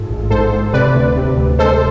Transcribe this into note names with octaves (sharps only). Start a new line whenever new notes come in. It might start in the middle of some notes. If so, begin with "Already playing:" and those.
Already playing: G#2 G#3 F4 G#4 A4
A1
G#2 A4 C5
G#2
C3 B4 D5
D2
C3
D2
G#3 A4 C5